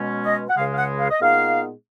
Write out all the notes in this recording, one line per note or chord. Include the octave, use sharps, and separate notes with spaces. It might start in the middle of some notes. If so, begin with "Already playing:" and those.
Already playing: B2 G#3 C#4
D#5
F#5
C#2 C#3 G#3 F5
F5
F#5
F5
D#5
A#2 G#3 B3 D#4 F5